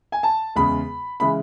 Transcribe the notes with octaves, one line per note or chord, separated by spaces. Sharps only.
G#5
A5
E2 C#3 G#3 B5
C#3 E3 G#3 B5